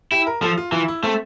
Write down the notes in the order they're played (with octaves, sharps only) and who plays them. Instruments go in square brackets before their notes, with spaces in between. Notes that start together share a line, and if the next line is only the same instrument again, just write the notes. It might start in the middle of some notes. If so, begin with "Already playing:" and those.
[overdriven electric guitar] E4 [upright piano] G4
[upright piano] A#4
[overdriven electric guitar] F3 [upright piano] A4
[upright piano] F4
[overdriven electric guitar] E3 [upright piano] F4
[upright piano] E4
[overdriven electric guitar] A3 [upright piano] C4